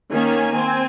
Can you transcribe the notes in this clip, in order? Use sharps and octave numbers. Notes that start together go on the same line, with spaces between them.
D#3 A#3 C#4 G#5
C4